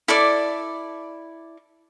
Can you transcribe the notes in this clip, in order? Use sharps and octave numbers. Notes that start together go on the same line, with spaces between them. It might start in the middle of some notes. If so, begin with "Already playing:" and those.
E4 A4 D5 D6